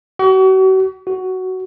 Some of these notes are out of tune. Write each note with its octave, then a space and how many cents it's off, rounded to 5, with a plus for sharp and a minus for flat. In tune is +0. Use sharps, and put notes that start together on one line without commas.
F#4 +40
F#4 +10